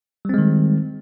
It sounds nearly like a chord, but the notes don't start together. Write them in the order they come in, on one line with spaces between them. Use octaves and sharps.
G3 C4 G#3 D#3